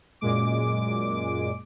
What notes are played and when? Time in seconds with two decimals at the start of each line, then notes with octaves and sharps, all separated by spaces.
0.21 F#2 A#2 G#3 D6